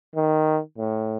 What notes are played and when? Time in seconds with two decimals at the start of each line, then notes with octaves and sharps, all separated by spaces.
0.15 D#3
0.78 A2